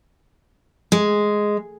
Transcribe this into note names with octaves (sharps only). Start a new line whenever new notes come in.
G#3